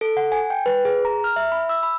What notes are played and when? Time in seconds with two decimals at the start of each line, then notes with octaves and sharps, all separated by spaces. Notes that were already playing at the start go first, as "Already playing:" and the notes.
0.01 A4
0.17 F#5
0.32 G#5
0.50 G5
0.66 B4
0.85 G#4
1.05 A#5
1.24 F6
1.36 E5
1.52 B5
1.69 E6
1.83 B5